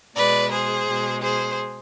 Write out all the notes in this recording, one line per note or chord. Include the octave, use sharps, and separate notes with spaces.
B2 G#3 B4 D5
G#4 C5
B2 G#3
G#4 C5